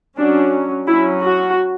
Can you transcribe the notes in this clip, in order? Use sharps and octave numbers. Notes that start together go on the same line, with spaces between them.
F#3 C#4 D4
F#3 C#4 E4
F#4